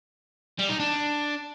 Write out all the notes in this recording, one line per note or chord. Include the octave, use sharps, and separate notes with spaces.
G3
D#4
D4